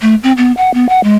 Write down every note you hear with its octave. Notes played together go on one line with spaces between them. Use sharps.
A3
C4
B3
F#5
B3
F#5
G#3